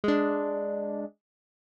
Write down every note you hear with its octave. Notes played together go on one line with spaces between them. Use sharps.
G#3 D4